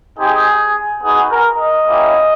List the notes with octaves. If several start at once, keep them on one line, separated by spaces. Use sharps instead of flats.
C4 D#4 G4 G#4
B3 D#4 F#4 G#4
A#4
D#5
A#3 C#4 E4 G4